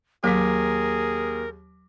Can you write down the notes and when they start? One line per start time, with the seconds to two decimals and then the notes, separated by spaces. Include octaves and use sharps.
0.24 D#2 F#3 G#4 A#4 D6 B6